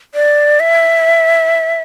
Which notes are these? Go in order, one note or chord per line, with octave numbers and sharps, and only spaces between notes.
D5
E5